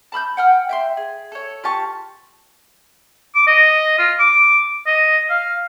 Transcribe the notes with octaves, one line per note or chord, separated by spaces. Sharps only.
A5 B5 E6 G6
F#5 G5 F6
E5 G5 C6
G#4
A4 C#5
F4 G4 A5 C#6
D6
D#5
F4
D6
D#5
F5